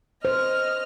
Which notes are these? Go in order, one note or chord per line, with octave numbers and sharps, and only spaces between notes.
C5 D#5 F6